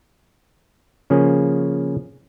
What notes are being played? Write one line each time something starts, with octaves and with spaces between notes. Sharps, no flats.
C#3 F3 A#3 C#4 G#4